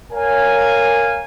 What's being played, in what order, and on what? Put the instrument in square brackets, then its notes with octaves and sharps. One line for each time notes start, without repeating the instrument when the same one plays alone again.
[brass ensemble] A#4 C#5 F5 G#5